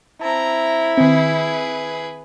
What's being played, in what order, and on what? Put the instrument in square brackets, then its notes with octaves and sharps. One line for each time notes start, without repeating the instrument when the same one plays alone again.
[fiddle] C4 A#5 [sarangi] E4 [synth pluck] A5
[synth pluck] D#3 C4 [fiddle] G#4 B4